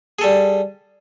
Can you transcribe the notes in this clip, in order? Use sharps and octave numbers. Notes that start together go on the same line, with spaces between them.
G3 G#4 A4